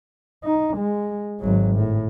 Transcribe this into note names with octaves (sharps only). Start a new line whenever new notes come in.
D#4
G#3
G#1 F#3
A2